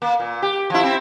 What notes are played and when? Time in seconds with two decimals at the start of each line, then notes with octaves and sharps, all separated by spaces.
0.02 A#3
0.20 A#2
0.42 G4
0.70 F3 E4
0.83 C4 E4